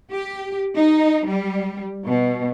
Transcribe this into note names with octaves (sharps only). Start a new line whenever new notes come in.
G4
D#4
G3
B2